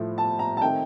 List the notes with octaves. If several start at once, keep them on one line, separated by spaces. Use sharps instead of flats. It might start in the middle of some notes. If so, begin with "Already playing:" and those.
Already playing: A2 F3 A3
A5
A#5
A5
D#3 A3 C4 D#4 G5